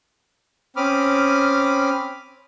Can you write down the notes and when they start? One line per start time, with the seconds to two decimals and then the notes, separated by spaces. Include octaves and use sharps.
0.76 C4 C#4 B5 D6 D#6 F6